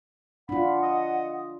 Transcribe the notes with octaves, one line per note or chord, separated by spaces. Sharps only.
D4 F4 F#5 B5
D#5